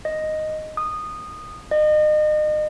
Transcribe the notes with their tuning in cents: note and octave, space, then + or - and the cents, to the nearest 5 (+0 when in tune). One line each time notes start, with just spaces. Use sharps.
D#5 +0
D#6 -15
D#5 -35